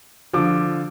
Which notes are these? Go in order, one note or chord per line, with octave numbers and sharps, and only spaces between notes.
D3 F3 D6